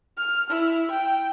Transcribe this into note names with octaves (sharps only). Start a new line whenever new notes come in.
F6
E4
G5